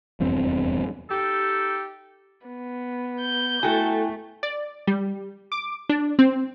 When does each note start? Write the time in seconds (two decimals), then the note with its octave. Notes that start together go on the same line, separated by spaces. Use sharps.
0.20 F1 E2 G2 C4
1.10 D#4 G4 A4
2.47 B3
3.20 G6
3.63 A3 E4 F#4 A4 G5 G#5
4.43 D5
4.87 G3
5.52 D6
5.89 D4
6.19 C4